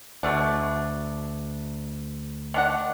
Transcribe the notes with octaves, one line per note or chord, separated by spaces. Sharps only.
D2 B2 A3 D4
D#3 D4 F#5